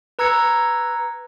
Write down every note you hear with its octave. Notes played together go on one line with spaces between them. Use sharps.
B4 A#5 E6 G#6 C#7